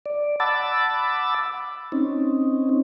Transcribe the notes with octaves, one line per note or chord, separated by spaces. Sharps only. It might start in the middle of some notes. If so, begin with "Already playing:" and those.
D5
F#5 A5 B5 D6 E6 A6
C4 C#4 D#4